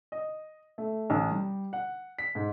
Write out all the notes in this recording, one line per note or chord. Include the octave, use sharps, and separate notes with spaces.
D#5
A3
A1
G3
F#5
B6
G#2